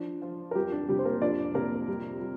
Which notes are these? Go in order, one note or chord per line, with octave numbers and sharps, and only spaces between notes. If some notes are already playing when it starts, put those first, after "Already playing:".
Already playing: F3 D4
F3 F4
A#4
F2 G3 G4
D4
C3 G3 G4
C5
A#3 A#4
F2 D4 D5
C3 A#3 A#4
G3
G3